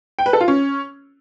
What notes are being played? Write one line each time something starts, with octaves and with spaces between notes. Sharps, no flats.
G5
B4
A4
F4
C#4